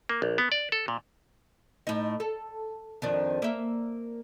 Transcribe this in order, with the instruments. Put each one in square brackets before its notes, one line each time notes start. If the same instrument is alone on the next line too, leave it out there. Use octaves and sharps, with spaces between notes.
[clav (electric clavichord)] A#3
A#1
B3
D5
A4
A#2
[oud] A2 D#4
A4
F2 D#3 D4
A#3 E5